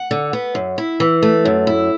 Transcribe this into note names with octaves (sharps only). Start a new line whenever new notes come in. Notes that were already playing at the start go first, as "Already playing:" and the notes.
Already playing: F#5
D3
B3
F#2
E4
E3
A3
F#2
E4